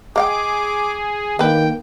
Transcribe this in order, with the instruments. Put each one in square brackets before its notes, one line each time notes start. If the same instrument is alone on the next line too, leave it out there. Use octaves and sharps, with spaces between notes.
[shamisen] G#3 F5 G5 [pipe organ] G#4 [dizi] D6
[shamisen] D3 B4 [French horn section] D#3 A#3 [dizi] G5